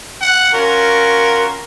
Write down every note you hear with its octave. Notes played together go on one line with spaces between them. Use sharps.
F#5
C#4 F4 F#4 A#4